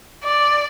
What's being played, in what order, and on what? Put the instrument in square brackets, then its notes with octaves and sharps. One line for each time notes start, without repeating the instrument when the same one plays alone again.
[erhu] D5